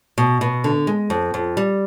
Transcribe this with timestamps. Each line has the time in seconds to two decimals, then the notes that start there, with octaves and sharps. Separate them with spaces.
0.18 B2
0.41 B2
0.64 D3
0.87 G#3
1.10 F2
1.34 F2
1.57 G3